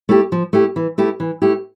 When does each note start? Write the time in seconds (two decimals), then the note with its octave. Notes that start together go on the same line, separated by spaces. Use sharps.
0.09 A3 E4 G4
0.32 F3
0.53 A3 E4 G4
0.76 E3
0.98 A3 E4 G4
1.20 E3
1.42 A3 E4 G4